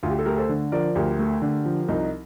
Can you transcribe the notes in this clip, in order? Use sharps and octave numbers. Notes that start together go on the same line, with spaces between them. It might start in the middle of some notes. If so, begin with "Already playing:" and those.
D2 F4
G4
A4
A3 G4 A#4
A4 C5
D3
F3 A#4 D5
D2 G4 A#4
A3
D3
F3
C2 D#4